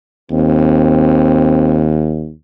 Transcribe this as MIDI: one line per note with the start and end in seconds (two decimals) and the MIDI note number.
0.31 2.32 39
0.31 2.01 60